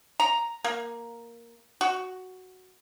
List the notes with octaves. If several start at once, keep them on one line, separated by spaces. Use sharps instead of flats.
A#5
A#3
F#4